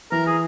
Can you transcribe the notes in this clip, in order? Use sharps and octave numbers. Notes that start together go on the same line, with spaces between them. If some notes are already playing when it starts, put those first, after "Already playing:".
E3 A#4
G#4